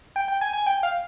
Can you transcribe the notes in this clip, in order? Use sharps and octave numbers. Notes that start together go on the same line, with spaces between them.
G5
G5
G#5
G#5
G5
F5